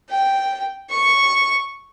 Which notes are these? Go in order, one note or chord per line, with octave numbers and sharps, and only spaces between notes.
G5
C#6